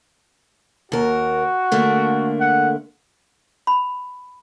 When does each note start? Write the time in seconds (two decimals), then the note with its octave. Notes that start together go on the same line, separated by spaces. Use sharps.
0.92 D#2 F#4 A#4
1.72 D3 A3 A#3
2.40 F#5
3.67 B5